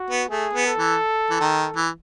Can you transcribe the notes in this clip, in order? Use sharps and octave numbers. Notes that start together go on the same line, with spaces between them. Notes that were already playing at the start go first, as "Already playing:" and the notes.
Already playing: F#4
B3
A3 G#4
B3
A4
E3
E3
D#3
E3